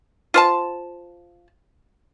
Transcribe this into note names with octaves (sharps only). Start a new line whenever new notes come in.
F4 C5 A5